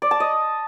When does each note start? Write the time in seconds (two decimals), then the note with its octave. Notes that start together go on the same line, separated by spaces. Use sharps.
0.02 D5
0.11 A5
0.20 D#5